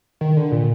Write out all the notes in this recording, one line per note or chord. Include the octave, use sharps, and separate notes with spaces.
D#3
D3
A#2